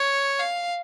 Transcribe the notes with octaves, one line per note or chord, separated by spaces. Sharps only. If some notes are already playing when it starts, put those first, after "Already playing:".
Already playing: C#5
F5